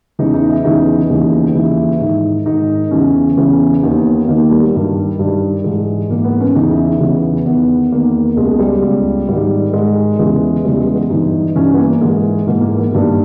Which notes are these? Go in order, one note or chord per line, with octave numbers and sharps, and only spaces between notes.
E2 C#3 E3 D#4
D#4
E4
E2 C#3 E3 D#4
D#2 C#3 E3
D#2 C#3 E3 E4
G#2 D#3 D#4
G#2 D#3 D#4
E2 C#3 E3 C#4
E2 C#3 E3
D#2 D#3 B3
D#2 D#3 A#3
G3
G2 D#3
G2 D#3
G#2 E3 G#3
G#2 E3 A#3
B3
C#4
E2 C#3 E3 D#4
E4
D#4
E2 C#3 E3 B3
E2 D#3 B3
E2 D#3 A#3
C#2 B2 G#3
G3
C#2 B2
G#2 D#3 G3
G#2 D#3 G#3
E2 C#3 E3 G#3
E2 C#3 E3 G3
G#3
B3
G2 E3 D#4
G2 E3 C#4
B3
A#3
G#2 E3 G#3
G#2 E3 A#3
A#3
B3
G2 D#3 A#3